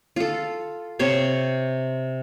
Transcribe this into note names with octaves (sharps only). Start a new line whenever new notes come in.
F4 A4
C3 C#5 C6